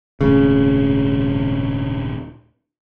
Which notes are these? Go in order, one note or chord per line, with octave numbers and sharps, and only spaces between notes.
D#1 G#2 C#3 A3